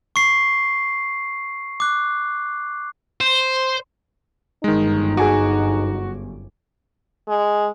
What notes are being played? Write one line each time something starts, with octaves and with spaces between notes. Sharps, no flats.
C#6 C7
D6 F#6
C5
G1 F#2 D#3 G#3 D#4
F#4 G#4 G#5 D6
G#3